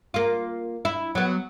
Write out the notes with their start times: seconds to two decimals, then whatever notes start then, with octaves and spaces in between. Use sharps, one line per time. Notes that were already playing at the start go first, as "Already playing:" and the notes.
0.14 A#3 F4
0.85 E4
1.15 F#3 B3